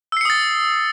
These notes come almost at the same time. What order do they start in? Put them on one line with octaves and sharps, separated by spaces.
E6 C7 C#7 D#6 A6